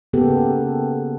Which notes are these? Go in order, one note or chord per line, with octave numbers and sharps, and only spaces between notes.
C#3 A#3 B3 G4 A4